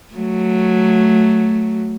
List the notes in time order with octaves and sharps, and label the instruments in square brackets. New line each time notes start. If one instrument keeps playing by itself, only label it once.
[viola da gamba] F#3 A3